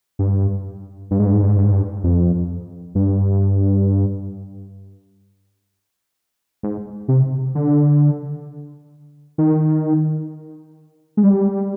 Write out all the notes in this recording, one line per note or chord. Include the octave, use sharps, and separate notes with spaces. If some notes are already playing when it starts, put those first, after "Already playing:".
G2
G2
G#2
G2
G#2
G2
G#2
G2
G#2
G2
F2
G2
G#2
C3
D3
D#3
G#3
G3